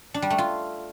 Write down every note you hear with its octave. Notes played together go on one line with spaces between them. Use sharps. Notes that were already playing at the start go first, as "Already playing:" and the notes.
D4
G3
A3
F4